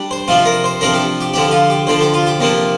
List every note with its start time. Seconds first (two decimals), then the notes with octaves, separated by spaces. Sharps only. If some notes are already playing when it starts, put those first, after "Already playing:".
Already playing: G3 D4
0.11 C5
0.28 C3 F3 D4 F4
0.45 A#4
0.64 C5
0.81 C3 F3 D4 A#4
0.94 G4
1.21 G4
1.34 D3 F3 D4 G4
1.51 F4
1.70 G4
1.87 D3 F3 D4 C5
2.01 G4
2.14 F4
2.27 G4
2.40 C3 F3 A#3 D4